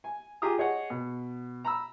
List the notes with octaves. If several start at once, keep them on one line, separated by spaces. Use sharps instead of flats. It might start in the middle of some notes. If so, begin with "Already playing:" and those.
G#5
F4 G4 G#4 A#5 D#6
G#4 C#5 D#5 F#5
B2
A#5 B5 E6